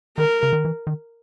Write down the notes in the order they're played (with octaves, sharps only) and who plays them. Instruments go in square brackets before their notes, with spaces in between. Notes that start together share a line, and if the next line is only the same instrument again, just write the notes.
[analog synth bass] D#3 [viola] A#4
[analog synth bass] C#3
D#3
E3
D#3